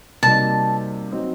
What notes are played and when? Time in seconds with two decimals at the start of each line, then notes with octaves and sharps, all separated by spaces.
0.23 C3 G3 A#3 D#4 F#4 A5
1.11 F#3 C4 D#4